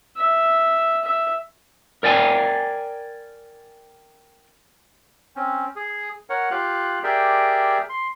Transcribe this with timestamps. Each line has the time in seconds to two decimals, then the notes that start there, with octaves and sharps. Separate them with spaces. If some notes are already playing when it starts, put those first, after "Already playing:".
0.17 E5
1.05 E5
2.03 A#4 D5 G5 G#5
5.36 C4 C#4
5.76 G#4
6.30 A#4 C#5 F#5
6.51 F4 G4 F5 F#6
7.04 G4 G#4 A#4 D5 E5 G5
7.89 C6